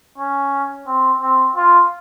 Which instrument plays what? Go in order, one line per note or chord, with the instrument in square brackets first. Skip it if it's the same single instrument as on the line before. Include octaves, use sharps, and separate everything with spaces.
[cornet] C#4
C4
C4
F4